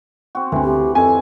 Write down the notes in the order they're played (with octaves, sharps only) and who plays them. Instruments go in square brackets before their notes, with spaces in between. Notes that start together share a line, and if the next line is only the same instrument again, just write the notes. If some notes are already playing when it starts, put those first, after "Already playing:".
[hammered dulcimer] C4 F#4
[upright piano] D2 [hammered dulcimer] E3 C4
[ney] G4
[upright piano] F2 G#5 [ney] A4